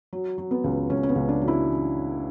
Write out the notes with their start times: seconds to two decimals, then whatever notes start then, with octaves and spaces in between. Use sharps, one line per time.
0.13 F#3
0.38 F#3
0.51 B3
0.64 C#2
0.89 C#2 C#4
1.03 C#4
1.09 B3
1.15 C#2
1.29 D4
1.41 F#3
1.48 E4